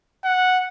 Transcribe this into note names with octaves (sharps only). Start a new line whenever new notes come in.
F#5